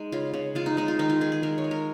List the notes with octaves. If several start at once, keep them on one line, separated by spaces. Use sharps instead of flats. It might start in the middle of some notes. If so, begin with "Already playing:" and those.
Already playing: G#3 D#4
C#3 F4
C#3
G#3 F4
D#4
G#3 D#4
F4
D#3 D#4
F4
D#3 G#4
G#4
G#3 A#4
C#5
G#3
A#4